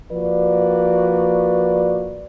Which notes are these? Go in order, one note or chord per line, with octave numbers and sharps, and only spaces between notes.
F3 A#3 F#4 B4 D5